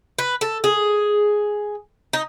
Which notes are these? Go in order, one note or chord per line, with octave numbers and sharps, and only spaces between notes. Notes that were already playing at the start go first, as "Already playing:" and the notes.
B4
A4
G#4
D#4